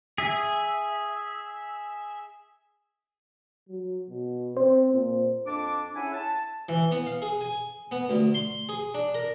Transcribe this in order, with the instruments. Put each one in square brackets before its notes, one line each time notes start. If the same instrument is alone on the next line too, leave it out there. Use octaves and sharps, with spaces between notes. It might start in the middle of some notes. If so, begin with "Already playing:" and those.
[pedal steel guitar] G#4 E5
[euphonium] F#3
B2
[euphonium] C4 [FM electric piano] C5
[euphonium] A#2
[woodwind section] F2 D4 A5 D6
C#4 E4 G#4 E5 F#5 G#5
A5
[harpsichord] E3
B3
F5
G#4
G#5
B3
D2
C6
G#4
D4
A#4